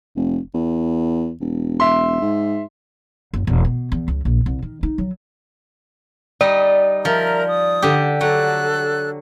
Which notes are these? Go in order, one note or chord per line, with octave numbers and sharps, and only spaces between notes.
F1
E2
E1
E5 C6
G#2
F#1
E1
B2
E2
C#2
A#1
C2
D#3
D#4
F#3
G3 D#4 D5
F3 A#4 E5 A#5
D#6
D3 G4
F#3 A4 F#6